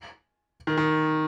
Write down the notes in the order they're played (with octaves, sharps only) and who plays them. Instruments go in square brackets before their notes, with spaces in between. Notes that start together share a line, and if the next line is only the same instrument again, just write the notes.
[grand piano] D#3
D#3